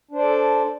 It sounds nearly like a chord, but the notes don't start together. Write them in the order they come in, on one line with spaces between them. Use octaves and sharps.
D4 C5 D5 A4